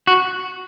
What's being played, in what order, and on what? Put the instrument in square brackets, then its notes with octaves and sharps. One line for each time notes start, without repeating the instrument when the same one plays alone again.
[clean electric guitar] F#4